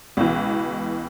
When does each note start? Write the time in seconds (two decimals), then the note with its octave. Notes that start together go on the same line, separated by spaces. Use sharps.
0.17 C#2 B2 E3